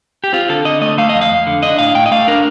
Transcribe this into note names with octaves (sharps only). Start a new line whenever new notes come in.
G4
C4 F4
D3 A4
D3 D#5
A3 D#5
A3 F5
D#5
F2
F5
F2
D3
D4 D#5
A2 F5
A2 G5
D#5
A3 F5
D4 A#4